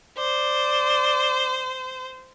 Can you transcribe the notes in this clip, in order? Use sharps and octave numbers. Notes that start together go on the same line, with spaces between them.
C5 D5